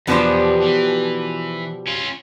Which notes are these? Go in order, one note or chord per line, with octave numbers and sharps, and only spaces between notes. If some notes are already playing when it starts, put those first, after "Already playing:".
E2 B2 F3 B3 D4 G4 C5
E3
C#4 F4